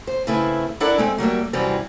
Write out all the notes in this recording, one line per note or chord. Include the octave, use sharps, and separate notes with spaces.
C5
C#3 A3 C4 E4 B4
D4 E4 A4 A#4 D5 F#5
G#3 A3 C4
F#3 G3 A3 A#3
F#2 C3 E3 G3 C4